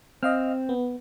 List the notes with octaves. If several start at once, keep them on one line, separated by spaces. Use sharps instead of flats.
C4 D#5 F5 F6
B3